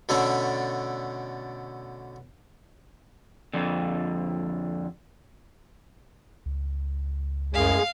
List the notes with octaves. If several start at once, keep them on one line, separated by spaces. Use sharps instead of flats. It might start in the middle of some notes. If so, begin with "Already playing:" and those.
B2 D3 A3 C#4 D4
F2 D3
C#2
F#2 A2 G#3 G#4 F5